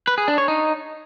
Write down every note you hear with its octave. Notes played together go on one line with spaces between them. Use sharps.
B4
G#4
D4
C#5
D#4